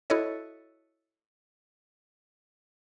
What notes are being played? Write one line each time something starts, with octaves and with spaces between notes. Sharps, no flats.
E4 F#4 A4 C#5 D#5